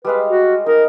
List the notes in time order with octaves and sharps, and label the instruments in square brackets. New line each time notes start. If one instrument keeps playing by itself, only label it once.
[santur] G3 G#3 F5 [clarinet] B4
[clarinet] F#4
[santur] D#4 [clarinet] A#4